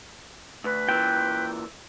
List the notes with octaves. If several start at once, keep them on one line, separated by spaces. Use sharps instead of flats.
D2 B4
A#2 E3 G5